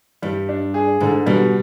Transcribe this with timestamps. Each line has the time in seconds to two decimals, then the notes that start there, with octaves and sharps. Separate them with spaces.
0.22 G2 G3
0.49 D4
0.74 G#4
1.00 G#2 D3
1.26 B2 G3